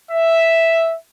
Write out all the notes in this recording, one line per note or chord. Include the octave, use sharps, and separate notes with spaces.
E5